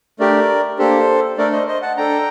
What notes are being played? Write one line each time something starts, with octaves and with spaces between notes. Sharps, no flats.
A3 D4 G4 A#4 D5
A#3 D4 G4 A4 C5
A3 D4 A4 A#4 D5
C5 D#5
C5 D#5
F#5 A5
D4 A4 G5 A#5